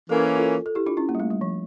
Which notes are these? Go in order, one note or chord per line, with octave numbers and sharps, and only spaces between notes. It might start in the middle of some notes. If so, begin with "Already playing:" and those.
E3 A#3 C#4 A4
A#4
F4 A4
A4
E4 G4
D4 F4
C#4 E4
A#3
G3
A3
G3
F3